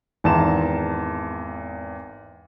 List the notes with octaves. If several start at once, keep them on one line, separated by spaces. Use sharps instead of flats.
G#1 E2 A5 A#5 C6 E7